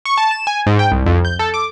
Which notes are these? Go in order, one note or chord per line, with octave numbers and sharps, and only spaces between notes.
C#6
A5
E7
G#5
G#2
G5
C2
F2
G6
A4
D6